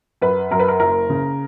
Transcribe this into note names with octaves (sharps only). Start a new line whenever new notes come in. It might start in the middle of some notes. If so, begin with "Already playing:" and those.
F#2 B4
F#2 A#4
B4
A#4
F#1 A#4
C#3